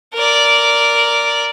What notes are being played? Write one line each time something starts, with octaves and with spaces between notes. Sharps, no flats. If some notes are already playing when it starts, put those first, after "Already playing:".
A#4 D5